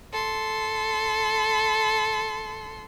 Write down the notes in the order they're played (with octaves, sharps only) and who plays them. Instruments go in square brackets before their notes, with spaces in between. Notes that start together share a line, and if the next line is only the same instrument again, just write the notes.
[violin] A4 C6